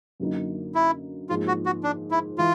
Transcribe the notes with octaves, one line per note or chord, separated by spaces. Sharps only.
F#2 D3 F#3 A#3 D#4
E4
G#2 F3 A#3 F4
F#4
F#4
D4
E4
E3 F4